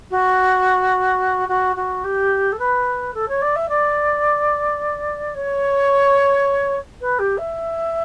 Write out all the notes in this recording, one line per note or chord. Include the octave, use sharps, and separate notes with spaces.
F#4
F#4
F#4
G4
A4
B4
A4
C#5
D5
E5
D5
C#5
B4
G4
E5